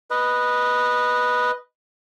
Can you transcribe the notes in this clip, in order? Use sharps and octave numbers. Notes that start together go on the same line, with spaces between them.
B4 D#5